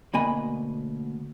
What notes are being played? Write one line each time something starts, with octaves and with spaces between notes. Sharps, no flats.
D2 B2 A#3 D#5 G#5 B5